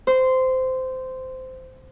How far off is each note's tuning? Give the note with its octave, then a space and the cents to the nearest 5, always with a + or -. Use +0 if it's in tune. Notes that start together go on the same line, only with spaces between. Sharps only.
C5 -15